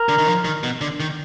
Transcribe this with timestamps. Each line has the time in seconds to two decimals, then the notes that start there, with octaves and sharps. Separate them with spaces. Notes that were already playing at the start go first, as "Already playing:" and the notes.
Already playing: A#4
0.09 D3
0.18 D#3
0.27 F3
0.45 D#3
0.63 B2
0.81 D3
1.00 D#3